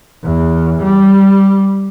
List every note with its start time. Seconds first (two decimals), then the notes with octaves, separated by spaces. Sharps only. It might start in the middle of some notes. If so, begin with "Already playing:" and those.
0.24 E2
0.83 G3